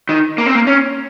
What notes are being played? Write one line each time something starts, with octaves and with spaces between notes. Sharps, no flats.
D#3
A#3
C4
A#3
C#4